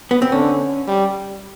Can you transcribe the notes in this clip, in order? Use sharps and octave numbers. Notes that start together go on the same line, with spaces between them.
B3
C4
D3 C#4
G3